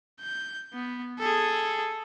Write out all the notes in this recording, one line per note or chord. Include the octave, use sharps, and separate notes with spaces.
G6
B3
G#4 A4